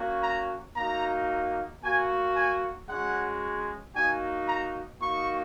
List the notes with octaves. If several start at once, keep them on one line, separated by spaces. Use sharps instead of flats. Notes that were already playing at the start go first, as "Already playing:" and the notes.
Already playing: A#3 C#4 F#4
A#5
A#3 D#4 F#4 A#5
A#3 F#4 G#5
G#5
G#3 C#4 F#4 F#5
A#3 D#4 F#4 G#5
A#5
A#3 D#4 F#4 C#6